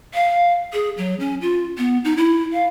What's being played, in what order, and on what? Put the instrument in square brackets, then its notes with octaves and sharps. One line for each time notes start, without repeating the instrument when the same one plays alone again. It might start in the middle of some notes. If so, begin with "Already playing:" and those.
[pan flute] F5
G#4
F#3
C#4
F4
B3
D#4
E4
F5